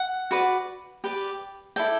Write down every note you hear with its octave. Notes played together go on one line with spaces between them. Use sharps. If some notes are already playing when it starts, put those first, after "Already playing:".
Already playing: F#5
F#4 B4 D5
G4 B4 D5
E4 A4 D5 G5